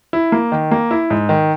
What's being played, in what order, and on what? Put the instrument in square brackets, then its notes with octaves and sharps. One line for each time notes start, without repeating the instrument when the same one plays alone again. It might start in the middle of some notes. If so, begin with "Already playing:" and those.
[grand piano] E4
A#3
D#3
A#3
E4
G#2
D#3